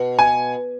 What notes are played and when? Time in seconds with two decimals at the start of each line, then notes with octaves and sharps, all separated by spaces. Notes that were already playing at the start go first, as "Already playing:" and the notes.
Already playing: B2
0.19 G#5